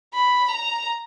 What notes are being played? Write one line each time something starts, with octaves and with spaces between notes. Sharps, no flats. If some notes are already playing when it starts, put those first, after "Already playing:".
B5
A#5